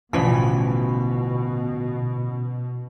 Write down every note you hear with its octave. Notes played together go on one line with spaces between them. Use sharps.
A1 B2 D3 E3 F3 C#4 B5